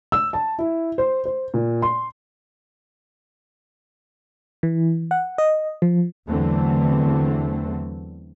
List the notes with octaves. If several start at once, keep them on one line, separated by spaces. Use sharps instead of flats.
E6
A5
E4
C5
C5
A#2
C6
E3
F#5
D#5
F3
E2 D3 E3 F#3 A3 C4